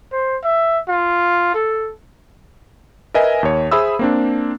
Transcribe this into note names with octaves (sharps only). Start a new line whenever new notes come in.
C5
E5
F4
A4
A#4 B4 D#5 E5 G#5
D#2 C#5
G#4 C5 E5 B5 D#6 E6
A#3 C4 D4